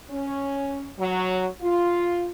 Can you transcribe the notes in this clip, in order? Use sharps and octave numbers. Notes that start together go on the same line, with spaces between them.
C#4
F#3
F4